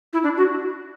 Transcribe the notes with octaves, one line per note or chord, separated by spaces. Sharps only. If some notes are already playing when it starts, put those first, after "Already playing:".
E4
D4
F#4